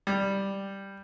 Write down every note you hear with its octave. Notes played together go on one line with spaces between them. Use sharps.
G3